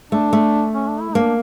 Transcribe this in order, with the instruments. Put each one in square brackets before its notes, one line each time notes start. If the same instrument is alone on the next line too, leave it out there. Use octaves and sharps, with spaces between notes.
[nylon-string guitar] A3 [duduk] D4
[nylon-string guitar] A3
[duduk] C#4
D4
E4
[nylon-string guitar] A#3 [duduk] D4